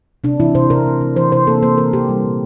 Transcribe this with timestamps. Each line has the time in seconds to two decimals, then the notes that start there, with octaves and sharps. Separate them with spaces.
0.24 C3 D4
0.40 E3 E4
0.55 C3 C5
0.70 C3 A#4
0.86 A3
1.01 E3
1.16 E3 C5
1.32 C3 C5
1.47 A#3 A4
1.62 A#3 C5
1.78 E3 A#4
1.93 E3 G4
2.09 G3
2.24 A#2